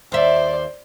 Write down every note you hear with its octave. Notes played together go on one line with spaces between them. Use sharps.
D#2 C5 D5 E5